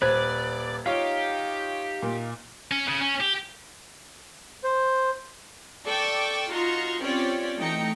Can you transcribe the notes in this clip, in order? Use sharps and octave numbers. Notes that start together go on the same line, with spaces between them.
D#1 B4 C5 D5 G#6
D#4 F4 G4 C#5 F5
A#2
C#4
C#3
C#4
G4
C5
A4 D5 G5 C#6 D6 E6
D#4 F4 F#4 A#5 C6 C#6
C4 C#4 F4 G4 C#5 D5
E3 A3 D#4 G5 A#5 C#7